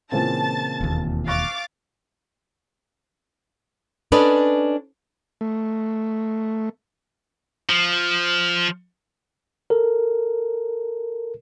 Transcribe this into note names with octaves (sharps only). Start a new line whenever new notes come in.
A#2 C#3 E3 C4 A5 A6
E1 D#2
F5 C#6 D6 F#6 A6 A#6
C#4 D4 A4 B4 D5 D#5
A3
F3
A4 A#4